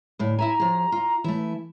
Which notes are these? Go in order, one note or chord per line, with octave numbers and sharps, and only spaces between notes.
D2 A2
E4 E5 G#5 A#5
F3 G#4
F4
E3 A3 E4